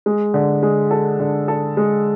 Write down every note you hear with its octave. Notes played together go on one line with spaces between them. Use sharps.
G#3
D3
G#3
A4
D3
A4
G#3